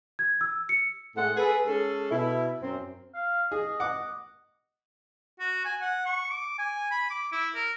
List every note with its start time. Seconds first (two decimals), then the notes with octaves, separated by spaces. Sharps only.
0.19 G#6
0.41 E6
0.69 C#7
1.15 A2 G#3 A3 C4 A4 F#5
1.36 G#4 A4 B4
1.66 G#3 C#4 G#4 A4
2.10 B2 E4
2.61 F#2 C4
3.14 F5
3.52 G#4 D#5
3.80 F#5 D6
5.40 F#4
5.65 G#5
5.82 F#5
6.06 C#6
6.31 D6
6.58 G#5
6.91 B5
7.10 D6
7.32 E4
7.55 A#4